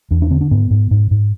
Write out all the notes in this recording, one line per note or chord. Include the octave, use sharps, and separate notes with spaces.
E2 D4
D4
D3 C4
D4
G#2 B3
G#2
G#2
G#2